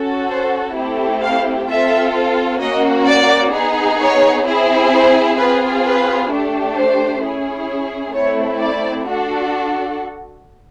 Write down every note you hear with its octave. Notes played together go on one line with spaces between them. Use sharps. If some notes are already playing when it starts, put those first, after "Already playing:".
Already playing: C#4 F#4 A4
C5
A3 C4 E4 G4
F5
C4 F4 A4 E5
A#3 C#4 F#4 D#5
D5
B3 D#4 G#4
C#5
C4 E4 G#4
C5
C4 F4 G#4 B4
B4
A3 D4 G4
C5
C#4 E4 G#4
A3 C4 E4 C#5
D5
D4 F#4 A4